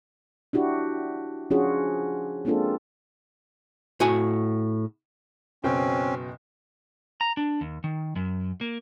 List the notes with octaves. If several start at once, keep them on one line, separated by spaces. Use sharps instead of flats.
D4 E4 F#4 G4
F3 C#4 D4 F4 F#4 G#4
G#3 A#3 C4 D4 F4 A4
A2 F#4 G#5
F#1 B2 C4 C#4 G5
A#5
D4
D#2
D#3
F#2
A#3